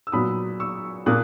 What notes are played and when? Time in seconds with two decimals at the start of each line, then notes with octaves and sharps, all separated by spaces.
0.07 E6
0.12 A#2 F#3 B3 B5 D#6
0.60 C#6 E6
1.06 A#2 A#3 D#6 F#6